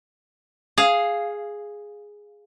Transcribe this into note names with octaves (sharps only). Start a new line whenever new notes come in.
G#4 F5